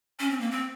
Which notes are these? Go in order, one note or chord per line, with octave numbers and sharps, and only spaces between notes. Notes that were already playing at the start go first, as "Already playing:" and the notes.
C#4
C4
A#3
C4